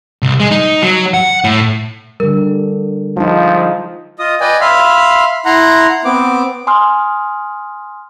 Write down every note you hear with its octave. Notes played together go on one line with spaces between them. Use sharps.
C2
G#3
D#4
F#3
F#5
A2
D3 G3 A#4
F3 G#3 D#4
F4 D#5 D#6
B4 D5 D#5 G5 G#5
E5 F5 B5 C6
E4 F#5 A#5 C6
B3 C4 D6
G#5 C6 D#6 F6